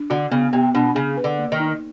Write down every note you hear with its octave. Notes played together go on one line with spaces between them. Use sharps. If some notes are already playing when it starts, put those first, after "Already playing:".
Already playing: D4
D3 F#4
C#3 B3
C3 B3
B2 D4
C#3 G#4
B4
D3
A#3
D#3
D#4